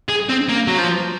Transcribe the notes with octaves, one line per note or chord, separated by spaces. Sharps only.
G#4
C4
A#3
F#3
F3